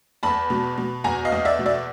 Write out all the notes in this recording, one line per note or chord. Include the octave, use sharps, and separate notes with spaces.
E2 A5 B5
B2
B2
E2 G#5 A#5
D#5 F5
E2
D5 E5
B2
D5 E5